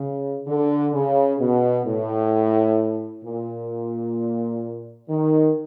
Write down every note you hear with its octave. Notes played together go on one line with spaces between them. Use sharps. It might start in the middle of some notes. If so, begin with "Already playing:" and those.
Already playing: C#3
D3
C#3
B2
A2
A#2
D#3